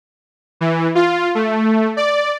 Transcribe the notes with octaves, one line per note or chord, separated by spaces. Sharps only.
E3
F4
A3
D5